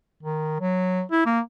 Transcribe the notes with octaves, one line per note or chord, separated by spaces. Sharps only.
D#3
F#3
E4
A#3